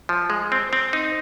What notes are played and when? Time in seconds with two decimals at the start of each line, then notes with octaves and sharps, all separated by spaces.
0.09 F3
0.30 G#3
0.52 C4
0.73 C4
0.93 D#4